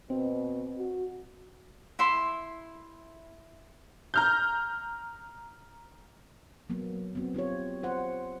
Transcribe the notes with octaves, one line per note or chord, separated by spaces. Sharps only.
B2 C4
F#4
E4 E5 C6
A#5 F6 G6
F#3 A#3 B3
B3 C4 F#4
C4 F4 G4 C#5
F4 C5 F#5